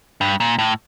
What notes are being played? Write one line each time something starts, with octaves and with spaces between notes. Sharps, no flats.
G2
A#2
A2